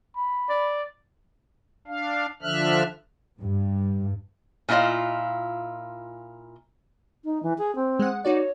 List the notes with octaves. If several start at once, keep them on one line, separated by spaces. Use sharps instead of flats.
B5
D5
D4 F5
D3 F3 D4 E5 F6 F#6
G2
A#2 E4 F4 D#5 F5
D#4
E3
G#4
C4
G#3 F#5
D#4 F#4 C#5 D5